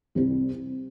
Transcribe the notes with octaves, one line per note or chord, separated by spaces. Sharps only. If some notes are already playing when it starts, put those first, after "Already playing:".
C2 C3 G3 C4